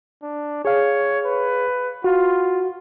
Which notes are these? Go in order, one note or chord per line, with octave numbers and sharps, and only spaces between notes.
D4
G#4 C#5 F5
B4
F4 F#4